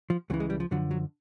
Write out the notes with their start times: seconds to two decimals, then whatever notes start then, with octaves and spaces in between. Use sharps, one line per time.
0.10 F3
0.30 C#2 C#3 E3 F#3
0.40 G#3
0.50 G3
0.60 F3
0.71 F#2 D3 F3 F#3
0.91 F#3